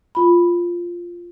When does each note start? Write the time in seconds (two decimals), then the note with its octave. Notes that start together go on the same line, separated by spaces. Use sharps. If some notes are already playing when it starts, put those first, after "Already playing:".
0.15 F4 B5